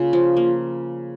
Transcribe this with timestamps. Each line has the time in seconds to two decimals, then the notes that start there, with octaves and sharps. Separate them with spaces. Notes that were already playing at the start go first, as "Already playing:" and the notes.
Already playing: C#3 A#3 F4
0.13 F3
0.37 A#3